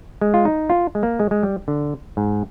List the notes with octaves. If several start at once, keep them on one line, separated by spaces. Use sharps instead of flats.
G#3
F4
D#4
F4
G#3
A#3
G#3
G#3
G3
D3
G#2